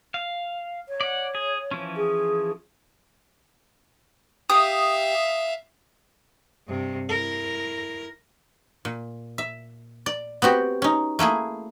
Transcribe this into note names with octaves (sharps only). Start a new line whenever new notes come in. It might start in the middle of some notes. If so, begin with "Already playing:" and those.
F5
C#5
D5 F#5
G#4
E3 F3 C#4
G#4
G4 E5 F5 D#6
G2 C3
E4 A#4
A#2
E5
D5
B3 C4 F#4 G4
C#4 D#4
A3 A#3 E4 G#4